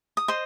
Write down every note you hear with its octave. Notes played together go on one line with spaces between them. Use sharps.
D#6
C5 D#5 C6